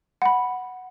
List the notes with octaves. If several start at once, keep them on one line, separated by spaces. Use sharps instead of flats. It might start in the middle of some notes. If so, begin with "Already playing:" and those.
F#5 B5